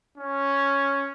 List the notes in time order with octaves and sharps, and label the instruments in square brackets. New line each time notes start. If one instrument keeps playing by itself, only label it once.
[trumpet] C#4